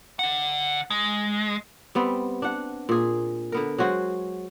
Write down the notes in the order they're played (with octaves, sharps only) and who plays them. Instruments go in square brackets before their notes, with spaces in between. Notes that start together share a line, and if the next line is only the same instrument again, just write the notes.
[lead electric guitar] D3 F#5
G#3
[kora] G3 B3 C4
D4 F#5
A#2 G#4
D3 B3 A#4
F#3 G#3 F#4 C5